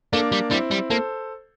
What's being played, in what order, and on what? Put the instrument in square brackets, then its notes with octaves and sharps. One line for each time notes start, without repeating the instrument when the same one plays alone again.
[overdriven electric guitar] A3 [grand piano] A#3 D4
[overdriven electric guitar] G3
[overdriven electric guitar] G3 [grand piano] C4 E4
[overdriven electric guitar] G3
[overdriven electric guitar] A#3 [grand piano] A4 C5